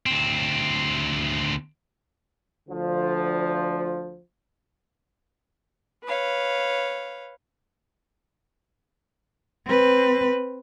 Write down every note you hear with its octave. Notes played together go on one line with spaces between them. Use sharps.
D2 C4
D2 D3 F3
B4 C#5 F5
C4 B4